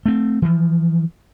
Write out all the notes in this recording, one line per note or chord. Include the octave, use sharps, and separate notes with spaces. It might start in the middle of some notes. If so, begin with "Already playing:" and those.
A3 C4
E3 F3